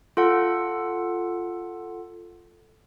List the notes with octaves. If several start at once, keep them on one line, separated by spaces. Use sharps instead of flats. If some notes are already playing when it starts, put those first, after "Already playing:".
F4 A4 F#5